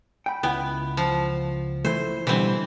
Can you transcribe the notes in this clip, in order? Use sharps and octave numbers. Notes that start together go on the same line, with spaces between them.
G5 B5
C#2 B3 E4 G5
F3
E3 A3 C5
B2 D3 E3 G3 C4